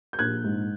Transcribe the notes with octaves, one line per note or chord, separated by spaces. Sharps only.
G6
A#1 F#6 G#6
G#2